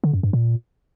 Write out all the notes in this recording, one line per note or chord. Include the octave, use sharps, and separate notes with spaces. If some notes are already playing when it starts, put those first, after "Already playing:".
D3
F#2
G2
A#2